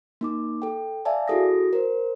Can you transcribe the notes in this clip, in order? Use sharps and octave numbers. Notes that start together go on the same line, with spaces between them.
A#3 D#4 D6
A4 G5
D5 E5 F5 G#5 A5
E4 F#4 G#4 A4 D#6 A#6
A#4 C5